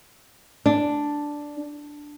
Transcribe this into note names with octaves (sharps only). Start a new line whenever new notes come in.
D4